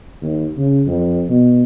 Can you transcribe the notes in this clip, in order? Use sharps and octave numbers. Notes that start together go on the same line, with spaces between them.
D#2
C#3
F2
B2